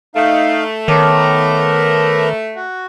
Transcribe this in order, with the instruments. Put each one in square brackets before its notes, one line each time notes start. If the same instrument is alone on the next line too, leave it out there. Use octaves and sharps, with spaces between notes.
[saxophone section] A3 [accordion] D#4 F5
[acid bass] D#3 [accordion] B3 A#4 A#5 [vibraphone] C#5 A5 D6
[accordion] F#4